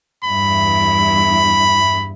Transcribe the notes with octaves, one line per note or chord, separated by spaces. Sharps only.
E2 G2 E4 B5